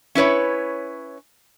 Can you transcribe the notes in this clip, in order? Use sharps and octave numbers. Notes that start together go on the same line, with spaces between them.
C#4 E4 B4 C#5